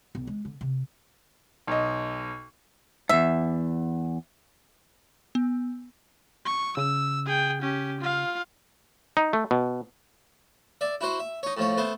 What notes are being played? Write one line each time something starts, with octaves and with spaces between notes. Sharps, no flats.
B1
G#3
D3
C3
B1 D#5
E2 G#2 E5
B3
C#6
C#3 E6
G#4 G5
C#4 G4
F4 F5
D#4
A3
B2
D5 E5
E4 F#4 C5
E5
D#4 C#5
A2 F3 C#5
A3 B3 C5